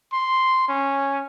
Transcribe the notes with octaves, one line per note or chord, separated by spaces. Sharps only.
C6
C#4